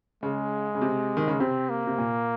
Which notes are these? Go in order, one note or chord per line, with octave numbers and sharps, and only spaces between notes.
C#3 G#3
C#3
C3
D#3
C#3
C3 C4
A#3
C3
A#2